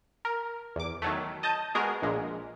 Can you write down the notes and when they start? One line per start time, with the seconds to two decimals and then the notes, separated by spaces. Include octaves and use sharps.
0.25 A#4
0.76 E2 D6
1.02 D#3 F#3 A3
1.43 D#5 A5 D#6 G6
1.75 G#3 B3 F#4 G#4 A#4
2.02 A#1 A#2 G#3